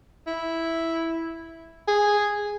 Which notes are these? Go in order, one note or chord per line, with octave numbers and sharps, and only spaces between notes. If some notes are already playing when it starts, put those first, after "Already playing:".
E4
G#4